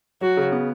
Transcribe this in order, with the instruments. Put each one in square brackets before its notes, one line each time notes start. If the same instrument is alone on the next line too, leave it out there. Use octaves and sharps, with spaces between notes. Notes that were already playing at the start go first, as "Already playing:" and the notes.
[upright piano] F#3 [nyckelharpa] F#4
[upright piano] C#3
B3